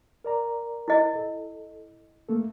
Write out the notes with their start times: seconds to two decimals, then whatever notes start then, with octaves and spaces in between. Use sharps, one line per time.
0.24 A#4 D5 A#5
0.88 E4 D#5
1.15 A4
2.29 A3 A#3 A4